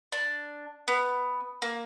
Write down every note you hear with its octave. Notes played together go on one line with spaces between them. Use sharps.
D4
B3
A#3